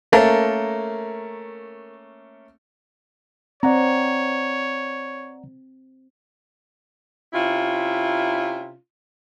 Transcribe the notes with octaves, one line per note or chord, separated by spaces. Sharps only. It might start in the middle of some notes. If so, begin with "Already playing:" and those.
A3 A#3 C#4 A#4 F5 A5
C4 C#5 D5 F#5 A#5
C3 C#4 E4 F4